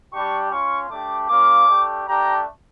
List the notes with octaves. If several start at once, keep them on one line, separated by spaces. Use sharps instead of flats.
G3 D4 G4 C#6
C#4 F4 C#6
A3 D4 G4 D6
A#3 C#4 F4 D6
A3 D4 G4
A3 D4 G4 A#5